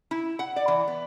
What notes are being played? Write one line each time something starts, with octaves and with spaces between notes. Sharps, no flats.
E4
F#5
D5
E3
B3